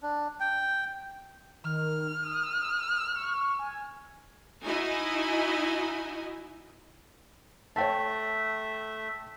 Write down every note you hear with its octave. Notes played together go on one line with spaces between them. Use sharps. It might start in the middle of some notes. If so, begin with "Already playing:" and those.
D4
G5
D#3 F6
D#6
C#6
G#5
D#4 E4 F#4 D#5 G#5
A3 C#5 E5 G5 A5